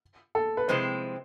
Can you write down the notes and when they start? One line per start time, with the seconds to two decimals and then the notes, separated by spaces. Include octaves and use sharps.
0.35 A4
0.57 B4
0.68 C3 F3 G#3 C4 E4 C5